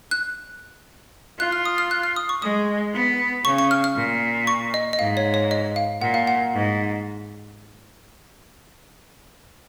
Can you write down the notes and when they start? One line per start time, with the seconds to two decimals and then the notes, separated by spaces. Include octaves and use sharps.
0.11 F#6
1.39 F4 F#6
1.52 F6
1.66 D#6
1.78 F6
1.91 F#6
2.03 F6
2.16 D#6
2.29 C#6
2.42 G#3 D#6
2.94 B3
3.45 C#3 C#6
3.58 C#6
3.71 F6
3.84 F6
3.96 A#2
4.47 C#6
4.74 D#5
4.93 D#5
4.99 G#2 F5
5.17 C#5
5.34 C#5
5.51 D#5
5.76 F5
6.02 A#2 F#5
6.14 F5
6.27 F#5
6.53 G#2